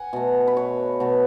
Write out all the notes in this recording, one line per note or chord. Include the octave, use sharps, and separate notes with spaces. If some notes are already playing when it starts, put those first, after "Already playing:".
Already playing: F#5 G#5
B2 A3
B4
C#5
B2 A3